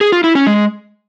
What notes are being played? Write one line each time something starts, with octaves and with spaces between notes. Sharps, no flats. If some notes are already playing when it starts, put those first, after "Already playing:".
G#4
F4
E4
C#4
G#3